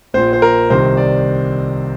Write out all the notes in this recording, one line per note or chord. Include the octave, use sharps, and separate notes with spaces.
A#1 A#2 C5
C5
A#4
C2 C3 D#3 C5
D5